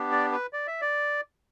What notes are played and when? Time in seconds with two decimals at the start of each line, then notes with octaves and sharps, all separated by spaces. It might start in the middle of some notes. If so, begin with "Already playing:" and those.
Already playing: B3 D4 G4
0.11 D5
0.32 B4
0.53 D5
0.67 E5
0.81 D5